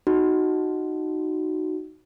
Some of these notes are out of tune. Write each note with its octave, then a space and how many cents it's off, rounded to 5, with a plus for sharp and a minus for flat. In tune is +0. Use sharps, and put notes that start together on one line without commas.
D#4 +0 F#4 +5